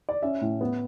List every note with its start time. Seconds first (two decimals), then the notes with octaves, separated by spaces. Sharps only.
0.09 D5
0.22 C#4 E5
0.41 A2
0.61 B3